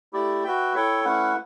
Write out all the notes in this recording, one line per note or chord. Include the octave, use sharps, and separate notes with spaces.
A3 E4 G4 D5
F#4 B4 E5 G5
E4 A4 C#5 G5
A3 C#4 E4 B4 F#5